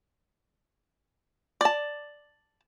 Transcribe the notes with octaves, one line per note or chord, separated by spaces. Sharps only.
D5 A5